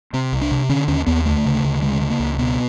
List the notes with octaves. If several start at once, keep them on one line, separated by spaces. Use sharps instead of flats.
C3 C4
C2
D4
C3
D3 C#4
D#2 C#4
D#2 B3
D2 A3
C#3
D2
C#3 G#3
C#3
A#3
C#2
B2 B3